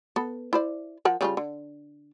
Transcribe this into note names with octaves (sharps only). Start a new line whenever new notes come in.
B3 A4
E4 C5 D5
F3 A#4 F#5
C#3 G3 F4
D3